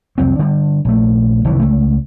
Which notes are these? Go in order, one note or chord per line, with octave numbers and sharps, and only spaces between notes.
C2 F2 F#3 C4
D3 G3
A#1 A3
F#1 C2 D#3 E3
C#2 A3